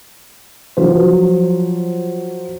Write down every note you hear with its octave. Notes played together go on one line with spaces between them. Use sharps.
F3 F#3 C5